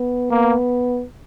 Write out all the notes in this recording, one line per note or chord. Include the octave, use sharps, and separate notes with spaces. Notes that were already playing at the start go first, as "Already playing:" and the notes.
Already playing: B3
A#3 B3